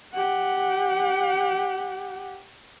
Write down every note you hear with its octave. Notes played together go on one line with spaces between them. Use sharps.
G4 F#5